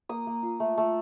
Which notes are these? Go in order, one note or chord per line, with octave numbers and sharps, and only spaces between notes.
A#3 D#6
A#3
F4
A3
A3